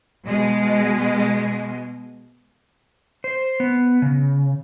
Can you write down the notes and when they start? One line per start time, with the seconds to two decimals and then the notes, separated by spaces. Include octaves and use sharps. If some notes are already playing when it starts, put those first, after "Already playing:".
0.25 B2 G#3
3.24 C5
3.60 B3
4.02 C#3